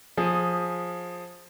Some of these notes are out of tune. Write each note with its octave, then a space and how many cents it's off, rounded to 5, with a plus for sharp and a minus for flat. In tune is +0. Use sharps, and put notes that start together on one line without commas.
F3 +15 G#4 +0